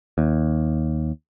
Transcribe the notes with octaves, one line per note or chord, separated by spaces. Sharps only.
D#2